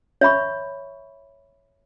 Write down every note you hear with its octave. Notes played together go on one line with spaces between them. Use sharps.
C#5 E5 B5 C#6